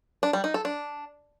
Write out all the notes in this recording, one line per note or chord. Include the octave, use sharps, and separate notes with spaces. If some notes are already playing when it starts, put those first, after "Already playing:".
D4
G3
D#4
A4
D4